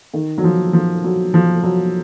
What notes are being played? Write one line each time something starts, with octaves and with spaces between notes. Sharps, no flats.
D#3
F#3
F3
F3
F#3
F3
F#3